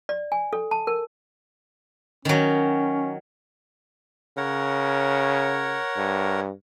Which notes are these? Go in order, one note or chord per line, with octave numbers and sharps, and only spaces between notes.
D5
G#5
A4
A5
A#4
D#3 F#3 C#4
C#3 A#4 C#5 F#5
G2